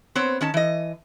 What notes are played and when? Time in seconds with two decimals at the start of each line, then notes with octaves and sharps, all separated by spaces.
0.15 B3 C4 C5 C#5
0.41 D#3 C#4 A5
0.54 E3 D#5